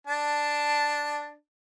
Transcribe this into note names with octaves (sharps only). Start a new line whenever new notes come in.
D4 A5